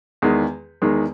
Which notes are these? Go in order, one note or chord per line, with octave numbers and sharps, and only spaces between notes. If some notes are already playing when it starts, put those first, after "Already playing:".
E2 D#3 G#3
E2 D#3 G#3